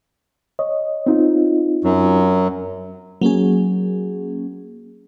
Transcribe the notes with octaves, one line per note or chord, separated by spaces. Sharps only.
C#5 D#5
C4 D#4 F4
F#2 F#3
F#3 A#3 C#4 G#4